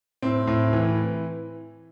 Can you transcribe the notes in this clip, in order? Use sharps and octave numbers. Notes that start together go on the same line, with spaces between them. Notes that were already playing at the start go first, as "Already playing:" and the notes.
A2 C4
A2
E3